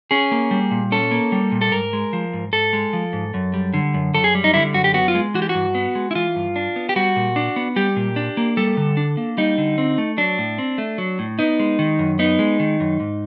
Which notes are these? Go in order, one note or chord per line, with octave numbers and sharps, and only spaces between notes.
C#4 G#4
A#3
G3
A#2
C#4 A4
A#3
G3
A#2
A4
G#2 A#4
G#3
F3
G#2
G#2 A4
G#3
F3
G#2
F#2
G3
D3
F#2
F#2 A4
G#4
G3
D#4
D3 E4
F#2 F#4
G4
B3 F#4
F4
G#3
E3 F#4
G4
F#4
G2
B3
G#3
E4
E3 F4
G2
D4
B3
G4
G3 F#4
A#2
D4
B3
G3 G4
A#2
D4
A#3
G3 A4
D3
D4
A#3
G3 D#4
D3
C4
A3
F#3 D4
A2
C4
A3
F#3
A2
B3 D#4
G#3
D#3
F#2
B3 D#4
G#3
D#3
F#2
G#2